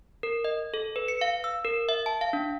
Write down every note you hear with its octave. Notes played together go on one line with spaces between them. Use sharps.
A#4
D#5
A4
B4
C#7
F5
E6
A#4
E5
A5
F5
D4